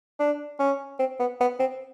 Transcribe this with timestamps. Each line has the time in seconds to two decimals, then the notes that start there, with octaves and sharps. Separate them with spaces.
0.20 D4
0.59 C#4
0.99 C4
1.20 B3
1.40 B3
1.60 C4